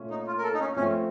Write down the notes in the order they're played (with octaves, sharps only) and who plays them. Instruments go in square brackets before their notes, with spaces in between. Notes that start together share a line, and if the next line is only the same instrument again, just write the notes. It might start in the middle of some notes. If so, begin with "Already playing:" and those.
Already playing: [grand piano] A#2 A3 C#4
[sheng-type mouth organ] D#4
F4
A#4
A4
D#4
C#4
[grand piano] F3 A3 C4 [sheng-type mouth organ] C#4